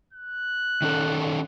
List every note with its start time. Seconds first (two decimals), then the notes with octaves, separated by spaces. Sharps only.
0.13 F#6
0.82 D#3 C#4 A4